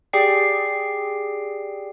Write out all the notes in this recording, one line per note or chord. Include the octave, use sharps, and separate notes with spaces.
G4 G#4 D5 G5 C7